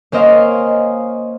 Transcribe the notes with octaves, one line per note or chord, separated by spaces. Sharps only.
A#3 C#4 C5 D#5 F5